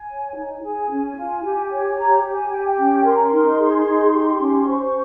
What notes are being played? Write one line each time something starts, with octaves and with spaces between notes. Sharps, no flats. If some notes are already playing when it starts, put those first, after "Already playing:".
Already playing: G#5
C#5
D#4
G#4 G#5
C#4
F4
G4
C#5
G4 A#5
G4
G#5
G4 G5
G#5
G5
C#4
A#4 C6
A#5
C6
D#4
G#4
D#4
G4
C#4
C5 C#6